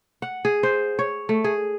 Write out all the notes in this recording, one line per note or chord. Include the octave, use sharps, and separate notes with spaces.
F#5
G#4
C5
C#5
A3
G#4